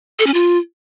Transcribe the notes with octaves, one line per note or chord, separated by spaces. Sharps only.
A4
C#4
F4